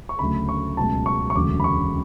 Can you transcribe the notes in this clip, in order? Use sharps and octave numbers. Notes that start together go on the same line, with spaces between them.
C#6
D2 C#3 F#3 A3 B5
C#6
C#2 B2 F#3 A3 A5
C#6
C#6
E1 D2 C#3 F#3 A3 D6
B5
C#6